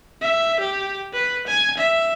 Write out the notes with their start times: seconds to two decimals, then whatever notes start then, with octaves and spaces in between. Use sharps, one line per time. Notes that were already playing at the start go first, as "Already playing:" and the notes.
0.22 E5
0.60 G4
1.13 B4
1.47 G#5
1.77 E5